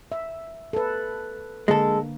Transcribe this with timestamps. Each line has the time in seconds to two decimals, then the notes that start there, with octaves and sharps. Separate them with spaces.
0.12 E5
0.73 A4 B4
1.68 D3 G#3 A#3 A4